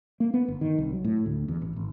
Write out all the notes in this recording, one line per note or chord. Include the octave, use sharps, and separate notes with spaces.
A#3
B3
G1
D#3
C2
F#3
A2
D2
E2
A1
G#1